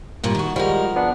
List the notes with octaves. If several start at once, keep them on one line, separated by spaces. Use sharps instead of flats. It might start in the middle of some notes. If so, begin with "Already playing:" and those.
G2 A#2 G3
D#3 F#4
F3 G3 G#3 F#4 A#4
B3 D4 F#5